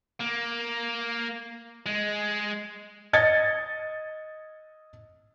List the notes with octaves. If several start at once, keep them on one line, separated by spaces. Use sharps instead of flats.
A#3
G#3
D#5 G#6 A6 C#7